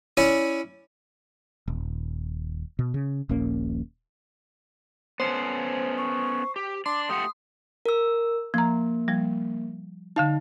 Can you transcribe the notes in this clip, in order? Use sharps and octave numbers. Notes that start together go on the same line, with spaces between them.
C#4 E4 C#5 D5
D#1
B2
C#3
D#1 A#1 A#3 C#4
B3 C#4 A4 C5
C#6
G4
D4 C6 D6
A3 G4 F#5 D#6
A#4 E6
F3 A#3 A#5
F3 G3
D3 D#4 F5 A5